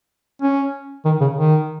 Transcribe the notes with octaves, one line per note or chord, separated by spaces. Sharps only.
C#4
D#3
C#3
D#3